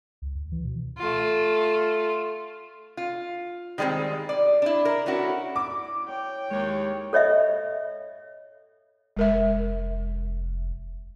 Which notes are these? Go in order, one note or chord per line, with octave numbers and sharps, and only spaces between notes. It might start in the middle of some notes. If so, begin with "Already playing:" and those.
C#2
D2
E3
B2
A3 F4
F4
D#3 G3 G#3 A#3 C4
D5
D4 E4
A#4
A3 C#4 E4 F#4
E4 D5 D6
C#5 G5
D#2 G#3 C#5
A4 C#5 D#5 E5
F1 G#3 A#4 E5